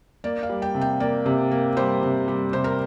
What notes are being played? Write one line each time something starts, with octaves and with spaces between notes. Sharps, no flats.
A#3 D5
F5
G3
G5
C3
G5
A#3 D5
C3
A#3
G3 C5
C3
G3
C3 C5
A#4